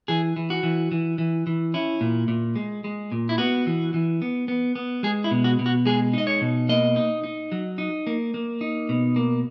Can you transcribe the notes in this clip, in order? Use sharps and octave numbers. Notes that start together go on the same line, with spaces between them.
E3 G#4
E3
F#4
E3
E3
E3
E3
C#4 E4
A#2
A#2
G#3
G#3
A#2
E4
B3 F#4
E3
E3
B3
B3
B3
G#3 G#4
E4
B2
F#4
B2
F#4
G#3 G#4
D#4 D#5
C#5
B2
A#3 D#5
D#4
D#4
F#3
D#4
A#3
A#3
D#4
B2
A#3